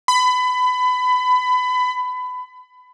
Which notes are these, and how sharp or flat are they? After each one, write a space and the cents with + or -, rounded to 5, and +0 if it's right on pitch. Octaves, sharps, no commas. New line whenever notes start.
B5 +25